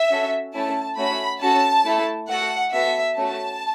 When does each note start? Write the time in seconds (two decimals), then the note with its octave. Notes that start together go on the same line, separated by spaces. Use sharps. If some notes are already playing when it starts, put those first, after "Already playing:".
Already playing: E5
0.10 C#4 F#4 A4
0.54 A3 C#4 E4 A5
0.97 A3 C#4 F#4 B5
1.41 C#4 F#4 A4 A5
1.85 A3 E4 A4
2.29 A3 F#4 A4 F#5
2.73 B3 F#4 A4 E5
3.16 A3 C#4 F#4 A5